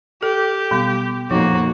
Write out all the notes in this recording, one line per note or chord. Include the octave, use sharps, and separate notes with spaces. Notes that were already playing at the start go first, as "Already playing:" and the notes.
G4 A4
B2 G3 B3
F2 A#2 F3 A#3 D#4 F#4